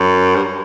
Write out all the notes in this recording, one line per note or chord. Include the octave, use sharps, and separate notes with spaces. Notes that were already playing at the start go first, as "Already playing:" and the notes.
Already playing: F#2
G2